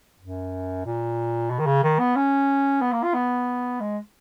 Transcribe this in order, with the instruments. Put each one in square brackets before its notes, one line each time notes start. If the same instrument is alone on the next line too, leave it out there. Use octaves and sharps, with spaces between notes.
[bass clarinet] F#2
A#2
B2
D#3
C#3
D#3
B3
C#4
B3
A#3
F4
B3
G#3